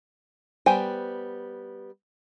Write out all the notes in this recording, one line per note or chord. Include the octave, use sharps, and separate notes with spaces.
G3 B3 C5 G5 G#5